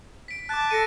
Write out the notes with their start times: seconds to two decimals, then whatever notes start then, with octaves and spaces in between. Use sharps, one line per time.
0.28 B6 D7
0.49 A5 D6 F#6
0.71 A4 A#6 C#7 D#7